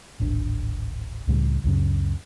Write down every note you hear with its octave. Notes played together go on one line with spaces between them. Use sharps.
D1 G#1 D4
C#2 A2 C#3 G3
C#2 F#2 C#3